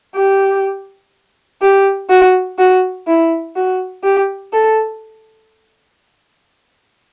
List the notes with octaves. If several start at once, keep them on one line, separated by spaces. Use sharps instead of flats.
G4
G4
F#4
F#4
E4
F#4
G4
A4